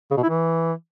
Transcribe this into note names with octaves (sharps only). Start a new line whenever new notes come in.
C#3
B2
E4
E3